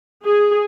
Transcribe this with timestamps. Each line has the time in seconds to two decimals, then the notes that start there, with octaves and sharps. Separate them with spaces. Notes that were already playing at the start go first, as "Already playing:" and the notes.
0.25 G#4